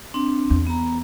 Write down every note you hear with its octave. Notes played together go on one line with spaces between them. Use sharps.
C4 D4 C6
E2
B3 A#5